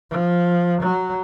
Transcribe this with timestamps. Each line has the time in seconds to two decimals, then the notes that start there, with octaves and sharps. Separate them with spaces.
0.10 F3
0.82 F#3